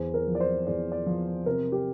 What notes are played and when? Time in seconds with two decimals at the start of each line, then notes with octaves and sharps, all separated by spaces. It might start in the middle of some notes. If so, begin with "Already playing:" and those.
Already playing: E2 C5
0.14 A#4
0.27 F3
0.35 D5
0.40 C5
0.67 E2 D5
0.92 D5
1.06 F3
1.46 C3 A#4
1.72 G4